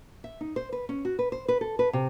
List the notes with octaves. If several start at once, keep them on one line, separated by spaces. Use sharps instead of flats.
E5
D#4
C5
B4
C#4
F#4
B4
C5
B4
A4
B4
C3